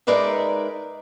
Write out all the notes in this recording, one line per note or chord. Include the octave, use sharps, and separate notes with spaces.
G#3 D#4 A#4 B4 D5 E5